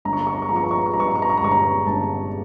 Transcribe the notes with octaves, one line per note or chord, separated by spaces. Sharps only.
G1 A#5
C#6
A#5
C#6
A#5
C#6
F3 A#5
C#6
A#5
C#6
A#5
C#6
A#5
G2 C#6
A#5
C#6
A#5
C#6
A#5
G1 C#6
A#5
G1 A5